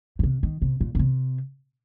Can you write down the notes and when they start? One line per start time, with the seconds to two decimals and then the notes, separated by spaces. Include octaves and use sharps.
0.19 A#2
0.23 C3
0.43 D#3
0.62 C3
0.81 A#2
0.95 C#3
0.99 C3